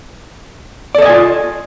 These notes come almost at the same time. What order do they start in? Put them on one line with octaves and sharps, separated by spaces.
D5 A4 D#5 G#5 F4